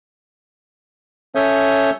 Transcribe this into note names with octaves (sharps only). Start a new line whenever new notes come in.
C#4 A4 C#5 E5 D#6 G6